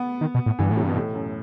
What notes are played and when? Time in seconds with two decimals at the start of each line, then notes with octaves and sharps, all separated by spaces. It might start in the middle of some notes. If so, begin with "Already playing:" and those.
Already playing: B3
0.21 D#3
0.34 B2
0.46 A2
0.59 G2 E3
0.71 A2
0.77 C3
0.83 G2
0.89 B2
0.95 A2
1.14 F#2